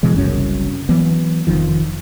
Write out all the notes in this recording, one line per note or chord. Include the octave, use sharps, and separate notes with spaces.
B2 E3 G#3
F#1 C2 F#2 C#4
E3 F#3 B3
F1 E2 D#3 F3